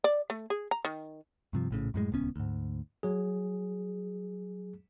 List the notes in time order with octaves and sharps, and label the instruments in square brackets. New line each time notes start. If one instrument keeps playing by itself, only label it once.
[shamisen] D5
A3
G#4
A#5
D#3
[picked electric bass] G2 C3 F3
A#1 A2 C#3
F#2 A2 G#3
D#1 C#2 B3 C#4
D2 G#2
[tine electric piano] F#3 G#4